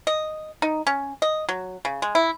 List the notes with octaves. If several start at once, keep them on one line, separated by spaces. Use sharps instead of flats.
D#5
D#4
C#4
D#5
F#3
C#3
G#3
E4